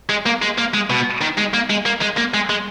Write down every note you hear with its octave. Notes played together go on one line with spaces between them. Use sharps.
G#3
A#3
G#3
A#3
G#3
B2
D#3
G#3
A#3
G#3
A#3
G#3
A#3
G#3
G#3